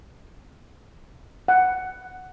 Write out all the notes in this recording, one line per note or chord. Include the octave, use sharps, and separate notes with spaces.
F#5